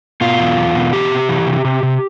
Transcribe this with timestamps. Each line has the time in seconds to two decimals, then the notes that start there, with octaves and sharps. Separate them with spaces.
0.21 B2 F4
0.39 E2
0.57 E2
0.75 B2
0.93 E3 G4
1.11 C3
1.29 E3
1.47 C3
1.65 C3
1.83 C3